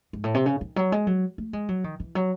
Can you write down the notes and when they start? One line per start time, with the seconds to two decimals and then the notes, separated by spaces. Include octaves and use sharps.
0.13 G#2
0.24 A2
0.34 C3
0.46 C#3
0.61 D#3
0.76 F#3
0.92 G#3
1.07 F#3
1.38 A3
1.53 G#3
1.69 F#3
1.84 D#3
2.00 E3
2.15 F#3